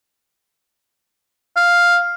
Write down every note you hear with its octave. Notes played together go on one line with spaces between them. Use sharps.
F5